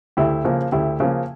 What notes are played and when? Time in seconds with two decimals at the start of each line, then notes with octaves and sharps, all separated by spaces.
0.17 D2 E4 G4
0.45 C#3 F3 A#3
0.72 D2 E4 G4
1.00 C#3 F3 A#3